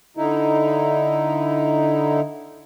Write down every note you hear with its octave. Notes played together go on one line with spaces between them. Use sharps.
D3 D#4 E4